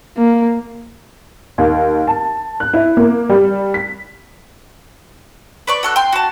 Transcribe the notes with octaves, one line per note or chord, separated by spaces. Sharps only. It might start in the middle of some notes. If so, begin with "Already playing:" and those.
A#3
D#2
A5
F#6
E4
A#3
G3
B6
B4 D5 C#6
F#4 A4 F#6
G5 C6
F#4 A5